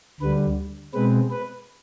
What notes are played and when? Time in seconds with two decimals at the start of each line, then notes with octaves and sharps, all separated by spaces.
0.21 D2 D3 G3 B4
0.94 B2 G#3 C4 B4
1.31 B4